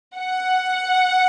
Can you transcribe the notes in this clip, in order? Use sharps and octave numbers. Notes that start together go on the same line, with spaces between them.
F#5